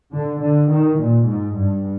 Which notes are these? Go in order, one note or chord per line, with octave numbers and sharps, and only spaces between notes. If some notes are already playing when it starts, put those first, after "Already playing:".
D3
D3
D#3
A#2
G#2
G2